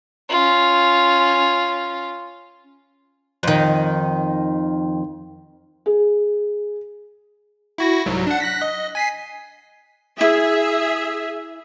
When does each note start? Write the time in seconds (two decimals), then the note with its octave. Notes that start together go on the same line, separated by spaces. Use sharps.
0.29 C#4 F4
3.43 F2 D#3
5.86 G#4
7.78 E4 F#4 A#6
8.06 C2 G#2 F#3
8.27 D4 F#5
8.40 F#6 A#6 B6
8.62 D#5
8.95 G#5 B6 C7
10.21 E4 G#4 E5